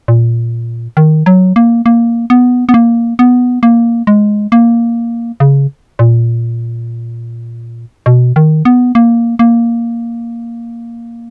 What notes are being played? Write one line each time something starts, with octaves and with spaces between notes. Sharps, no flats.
A#2
D#3
F#3
A#3
A#3
B3
B3
A#3
B3
A#3
G#3
A#3
C#3
A#2
B2
D#3
B3
A#3
A#3